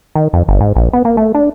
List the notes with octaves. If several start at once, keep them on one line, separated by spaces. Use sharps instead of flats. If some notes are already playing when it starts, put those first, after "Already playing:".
D#3
F2
G1
G#2
A#1
B3
A#3
A3
D4